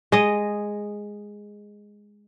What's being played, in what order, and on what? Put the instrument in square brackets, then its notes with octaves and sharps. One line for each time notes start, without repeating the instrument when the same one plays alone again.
[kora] G#3 D#5